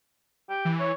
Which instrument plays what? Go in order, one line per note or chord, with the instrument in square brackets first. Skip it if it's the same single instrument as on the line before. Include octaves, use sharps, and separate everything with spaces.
[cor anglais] G4
[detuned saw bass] E3
[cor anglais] C#5